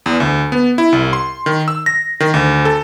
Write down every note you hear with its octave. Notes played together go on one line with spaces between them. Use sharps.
E2
D2
B3
E4
C2
C6
D#3
E6
A#6
D#3
D2
A4